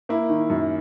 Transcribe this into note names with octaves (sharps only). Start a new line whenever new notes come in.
A#3 E4
D#3
F#2